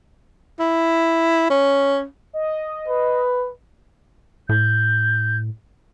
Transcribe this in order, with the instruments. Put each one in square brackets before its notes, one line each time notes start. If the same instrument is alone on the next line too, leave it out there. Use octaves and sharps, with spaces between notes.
[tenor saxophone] E4
C#4
[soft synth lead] D#5
[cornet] B4
[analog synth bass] A2 [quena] G6